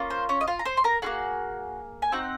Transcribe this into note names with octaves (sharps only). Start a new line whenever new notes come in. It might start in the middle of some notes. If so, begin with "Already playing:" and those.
Already playing: A#3 C#4 F4
C5
C#4 C#5
D#5
F4 F5
A#5
C5 C6
C6
A#4 A#5
A#3 F4 F#4 G#4 F#5
G#5
C4 D#4 F#4 F#5